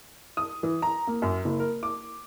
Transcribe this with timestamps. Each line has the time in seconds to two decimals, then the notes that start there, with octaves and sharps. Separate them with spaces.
0.37 D#6
0.63 E3
0.82 A#5
1.07 A#3
1.22 F#2
1.45 F#1
1.60 A#4
1.83 D6